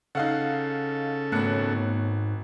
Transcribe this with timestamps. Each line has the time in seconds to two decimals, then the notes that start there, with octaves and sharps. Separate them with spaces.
0.15 C#3 D#4 A4 F5 F#5
1.32 G#1 G#2 A3 B3 C#5 F#6 C#7